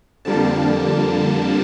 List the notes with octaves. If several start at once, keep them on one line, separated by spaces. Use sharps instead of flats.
F2 D3 G3 A#3 A5